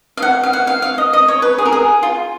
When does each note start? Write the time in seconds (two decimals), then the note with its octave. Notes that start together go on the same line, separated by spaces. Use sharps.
0.17 F5
0.22 F#5
0.43 F5
0.53 F#5
0.67 F5
0.82 F5
0.98 D#5
1.13 D#5
1.28 C#5
1.42 B4
1.58 G#4
1.65 A#4
1.72 G#4
2.03 F4